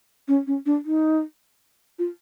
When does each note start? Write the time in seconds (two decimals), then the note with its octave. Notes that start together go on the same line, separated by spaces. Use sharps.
0.28 C#4
0.47 C#4
0.66 D4
0.85 D#4
1.99 F4